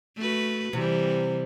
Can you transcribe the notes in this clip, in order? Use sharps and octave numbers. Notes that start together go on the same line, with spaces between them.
A3 F#4 B4
C3 E3 G3